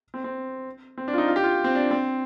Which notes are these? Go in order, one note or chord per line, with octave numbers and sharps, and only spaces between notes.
C4
C4
C4
D4
F4
D#4
F4
G4
F4
C4
D4
C4